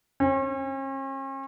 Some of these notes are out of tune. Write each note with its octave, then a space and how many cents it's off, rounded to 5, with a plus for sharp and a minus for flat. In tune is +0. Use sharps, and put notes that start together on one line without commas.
C#4 -45